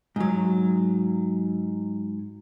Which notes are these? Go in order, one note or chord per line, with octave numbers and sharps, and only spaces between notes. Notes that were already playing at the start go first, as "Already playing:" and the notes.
G#2 F#3